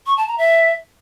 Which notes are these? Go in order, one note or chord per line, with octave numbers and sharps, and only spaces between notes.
C#6
A5
A#5
E5